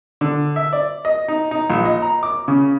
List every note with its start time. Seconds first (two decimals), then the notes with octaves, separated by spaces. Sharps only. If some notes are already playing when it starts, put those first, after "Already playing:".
0.21 D3
0.56 E5
0.73 D5
1.05 D#5
1.28 D#4
1.51 D#4
1.70 A#1
1.85 D#5
2.02 A#5
2.23 D6
2.48 C#3